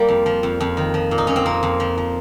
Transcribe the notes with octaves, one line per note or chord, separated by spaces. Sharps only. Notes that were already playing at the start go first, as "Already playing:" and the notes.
Already playing: G3 A#3
F2
F3
F2
F2
D#3
F3
A#2
D#4
A#2 C#4
C4
F2 A#3
F2
F3
F3